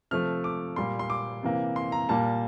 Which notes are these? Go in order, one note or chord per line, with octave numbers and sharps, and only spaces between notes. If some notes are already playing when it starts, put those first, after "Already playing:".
C3 F3 A3 F6
D6
A#2 G3 A#3 C6
C6
D6
C3 E3 A#3
C6
A#5
A#2 G3 A#3 A5